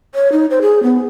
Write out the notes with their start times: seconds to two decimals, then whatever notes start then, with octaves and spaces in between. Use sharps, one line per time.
0.15 C#5
0.32 D#4
0.50 C5
0.62 G#4
0.83 B3